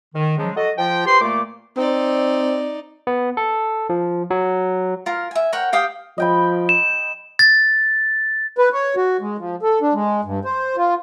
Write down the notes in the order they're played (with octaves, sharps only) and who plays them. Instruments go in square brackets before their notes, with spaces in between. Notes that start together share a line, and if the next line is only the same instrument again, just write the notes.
[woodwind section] D#3
C#3 F3 F#3 G#3
F#4 A4 D#5
F3 F4 G5
G4 B4 C5 C6
A#2 A3 A#3 D6
[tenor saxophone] C4 [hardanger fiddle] D#4 D5
[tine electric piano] B3
A4
F3
F#3
[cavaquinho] F4 A#4
E5 G#5
A#4 C#5 F#5 G5
G4 F5 G5 D#6
[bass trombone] F3 [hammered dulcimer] D#5 G5 B5
[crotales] E7
[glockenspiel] A6
[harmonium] B4
C#5
F#4
G#3
F3
A4
D4
G#3
G2
C5
F4